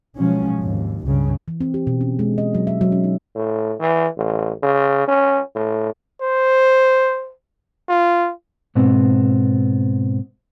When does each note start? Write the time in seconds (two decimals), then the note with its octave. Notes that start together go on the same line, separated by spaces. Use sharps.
0.18 B2 F3 F#3 G#3 C#4
0.60 G#1 D#2
1.06 C#2 G2 C#3
1.48 E3
1.61 C4
1.74 G4
1.87 B2
2.01 C#4
2.19 G#3
2.38 D#5
2.55 F#3
2.67 E5
2.81 F#3
2.92 C#4
3.04 D#4
3.35 A2
3.80 E3
4.17 A1
4.62 C#3
5.08 C#4
5.55 A2
6.21 C5
7.89 F4
8.75 G#2 B2 B3 C4